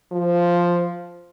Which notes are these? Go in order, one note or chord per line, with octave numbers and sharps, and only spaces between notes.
F3